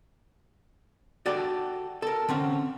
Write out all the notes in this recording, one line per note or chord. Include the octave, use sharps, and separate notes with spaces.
F#4 G4 A4 D5
A4 A#4
D3 C4 C#4